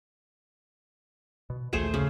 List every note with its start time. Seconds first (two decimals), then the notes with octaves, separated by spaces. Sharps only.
1.50 B2
1.73 A#1 D#2 E3 A3 G#4 C5
1.94 C#3